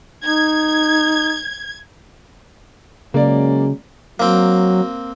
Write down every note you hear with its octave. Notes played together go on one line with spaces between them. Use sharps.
D#4 G#6
C#3 F#3 G#3 A#3 C#4 D5
F#3 A#3 C4